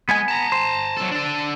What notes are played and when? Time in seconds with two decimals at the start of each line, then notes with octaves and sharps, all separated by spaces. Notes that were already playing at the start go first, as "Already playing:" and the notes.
0.09 G#3 B3 G#5
0.28 A5 A#5
0.52 C5
0.97 F#3 A4
1.11 D4 A4